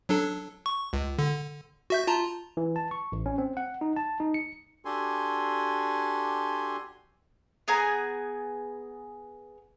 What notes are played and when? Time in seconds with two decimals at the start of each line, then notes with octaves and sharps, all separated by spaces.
0.09 F#3 D4 A4
0.66 C#6
0.93 C#2
1.19 D3
1.90 F#4 E5 G6
2.07 F4 A5 A#5
2.57 E3
2.76 A5
2.91 C#6
3.12 A1
3.26 C#4
3.38 C4
3.57 F#5
3.81 D#4
3.96 A5
4.20 D#4
4.34 C#7
4.85 D4 F#4 G4 A4 G#5 C6
7.68 B3 G#4 G#5 A#5